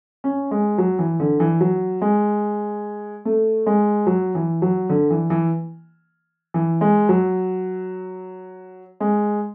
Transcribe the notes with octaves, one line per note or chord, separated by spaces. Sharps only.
C#4
G#3
F#3
E3
D3
E3
F#3
G#3
A3
G#3
F#3
E3
F#3
D3
E3
E3
E3
G#3
F#3
G#3